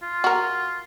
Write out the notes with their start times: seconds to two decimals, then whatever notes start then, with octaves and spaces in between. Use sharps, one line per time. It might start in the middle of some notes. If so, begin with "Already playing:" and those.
0.02 F4
0.24 F#4 A#4